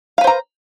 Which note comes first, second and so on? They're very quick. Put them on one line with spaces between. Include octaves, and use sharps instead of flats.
F5 B4 C5 A#5